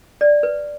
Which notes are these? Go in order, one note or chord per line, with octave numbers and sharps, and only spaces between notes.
D5
B4